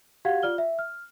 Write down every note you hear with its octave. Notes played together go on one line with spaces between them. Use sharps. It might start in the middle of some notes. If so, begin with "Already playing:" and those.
F#4 G4 F5 F#5 G#6
F4 D5 F6 G7
E5
F6